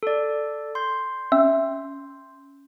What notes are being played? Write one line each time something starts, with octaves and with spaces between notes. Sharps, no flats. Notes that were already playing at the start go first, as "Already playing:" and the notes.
A4 D5
C6 G6
C#4 E5